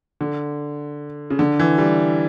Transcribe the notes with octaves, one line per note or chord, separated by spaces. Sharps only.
D3
C#3
D3
E3
G3